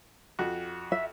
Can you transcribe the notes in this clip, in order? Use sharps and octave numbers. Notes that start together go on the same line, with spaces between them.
F2 F#4
E5